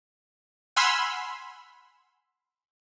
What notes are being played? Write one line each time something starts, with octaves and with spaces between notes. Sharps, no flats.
F#5 G#5 B5 C6 E6 F6